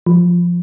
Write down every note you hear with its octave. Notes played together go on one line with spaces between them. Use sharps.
F3